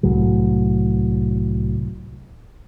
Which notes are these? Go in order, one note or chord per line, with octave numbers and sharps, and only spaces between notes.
C2 A2 F#3